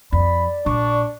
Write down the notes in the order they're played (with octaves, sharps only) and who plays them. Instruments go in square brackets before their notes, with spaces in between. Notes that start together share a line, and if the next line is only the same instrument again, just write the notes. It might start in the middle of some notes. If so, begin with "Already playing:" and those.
[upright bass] F2 [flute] D5 [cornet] B5
[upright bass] A#1 [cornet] D4 [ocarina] C#6